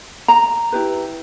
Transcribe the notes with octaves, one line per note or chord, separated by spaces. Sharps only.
A#5
E4 G4 B4